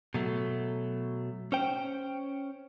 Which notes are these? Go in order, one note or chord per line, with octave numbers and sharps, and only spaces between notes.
B2 F#3 A3
C#4 C5 G5